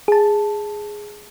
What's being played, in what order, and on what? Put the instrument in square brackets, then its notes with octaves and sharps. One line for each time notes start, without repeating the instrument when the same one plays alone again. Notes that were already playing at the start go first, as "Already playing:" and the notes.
[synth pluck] G#4 A5